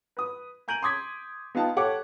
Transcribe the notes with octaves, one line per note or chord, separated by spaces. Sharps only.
B4 D#6
G#5 A#5 G6 D7 D#7 F#7
C6 D6 D#6 G#6 B6
B3 D#4 F4 F5 G5 A5
G4 A4 C#5 F#5 A5 D6